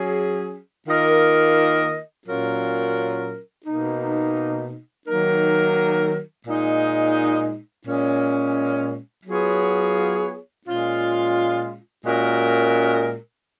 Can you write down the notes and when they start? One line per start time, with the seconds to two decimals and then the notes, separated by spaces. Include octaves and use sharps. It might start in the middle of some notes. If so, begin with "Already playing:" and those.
Already playing: F#3 C#4 G#4
0.87 D#3 A#3 F4 A#4 D#5
2.27 A#2 F#3 C#4 F4 A#4
3.66 B2 A#3 D#4
5.07 D#3 F#3 A#3 D#4 A#4
6.47 A#2 G#3 D#4
7.86 A#2 G#3 C#4
9.26 F#3 B3 F4 G#4 C#5
10.66 A#2 G#3 C#4 F4
12.05 A#2 G#3 C#4 F#4 A#4